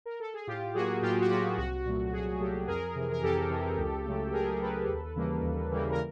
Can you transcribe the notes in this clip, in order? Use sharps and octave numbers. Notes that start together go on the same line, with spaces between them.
A#4
A4
G#4
A2 F4 G4
F#3 A#3 F#4 G#4
A2 F4 G4
F#4
F#3 A#3 F4 G4
C2 F#4
A#2 F#3 A3
C2 F#4 G#4
A#2 F#3 A3 G4 A4
F2 G#4 A#4
C3 E3
A#4
F2 G4 A4
C3 E3
C#2
C#3 F#3 A3
C#2 G#4 A#4
C#3 F#3 A3 A4 B4
D#2
C#3 E3 G3 A#3
D#2
C#3 E3 G3 A#3
A#4